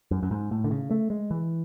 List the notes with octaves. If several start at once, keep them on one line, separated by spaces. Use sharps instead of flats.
F#2
F#2
G#2
A2
D3
C#3
A3
G#3
E3